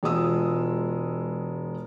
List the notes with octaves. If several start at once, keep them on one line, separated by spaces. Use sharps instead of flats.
E1 G#3 F4 D#6 E6